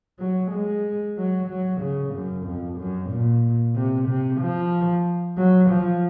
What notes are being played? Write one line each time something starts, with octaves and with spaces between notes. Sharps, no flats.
F#3
G#3
F#3
F#3
C#3
F#2
F2
F#2
A#2
C3
C3
F3
F#3
F3